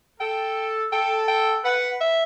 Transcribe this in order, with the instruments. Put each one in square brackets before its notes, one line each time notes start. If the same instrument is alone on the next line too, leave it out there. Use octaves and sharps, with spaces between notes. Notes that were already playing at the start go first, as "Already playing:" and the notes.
[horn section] A4 [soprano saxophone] G5
[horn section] A4 [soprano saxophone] G5
[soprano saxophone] G5
[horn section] B4 [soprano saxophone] F#5
[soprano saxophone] E5